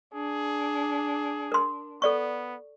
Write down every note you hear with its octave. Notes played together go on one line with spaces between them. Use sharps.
D4 G#4
A#4 C6
B3 A4 D5 C#6